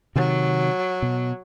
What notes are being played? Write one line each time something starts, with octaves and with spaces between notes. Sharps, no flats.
C3 D#3 F#3
B2